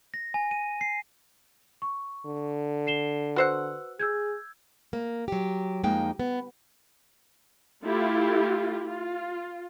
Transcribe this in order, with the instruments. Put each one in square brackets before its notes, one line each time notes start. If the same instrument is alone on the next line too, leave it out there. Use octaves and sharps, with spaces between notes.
[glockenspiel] A#6
G#5
D#7
C7
[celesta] C#6
[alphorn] D3
[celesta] C7 E7 G7
[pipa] F#4 C5 F#5 [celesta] B4 E6
[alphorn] G#4 [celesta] E6 G6 G#6
[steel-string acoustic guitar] A#3
F#3 G4
F2 G#3 A#3 D#4 G5
B3
[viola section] A3 E4 F4 G4
F4